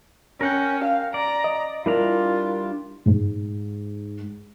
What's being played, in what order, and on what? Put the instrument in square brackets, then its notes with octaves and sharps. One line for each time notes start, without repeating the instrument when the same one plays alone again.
[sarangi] C#4 [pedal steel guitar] A#4 F#5 G5
[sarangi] F5
[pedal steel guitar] D5 [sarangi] A#5
[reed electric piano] D#5
[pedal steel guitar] G3 D4 A#5 [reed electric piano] E4 A#4 [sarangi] F4
[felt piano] G#2